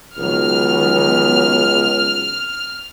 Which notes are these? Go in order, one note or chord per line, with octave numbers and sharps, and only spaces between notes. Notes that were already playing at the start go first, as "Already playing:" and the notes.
C#2 D#3 F#3 B3 F6